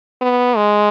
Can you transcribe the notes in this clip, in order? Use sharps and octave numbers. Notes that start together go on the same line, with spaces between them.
B3
G#3